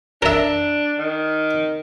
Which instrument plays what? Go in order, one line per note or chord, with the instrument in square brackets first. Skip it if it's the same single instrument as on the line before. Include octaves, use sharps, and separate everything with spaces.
[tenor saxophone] D4 [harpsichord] A#4 E5
[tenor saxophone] D#3